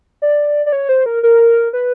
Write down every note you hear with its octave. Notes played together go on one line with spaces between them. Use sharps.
D5
D5
C#5
C5
A#4
A#4
B4